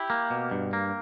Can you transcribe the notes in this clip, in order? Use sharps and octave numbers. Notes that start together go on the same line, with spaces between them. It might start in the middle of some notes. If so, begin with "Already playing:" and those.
Already playing: E4 G4
A#3
B2
G2
A#3